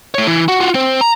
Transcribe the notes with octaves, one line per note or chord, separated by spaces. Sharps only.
A3 C#5
E3
F#4
F4 F#4
C4 C5
A#5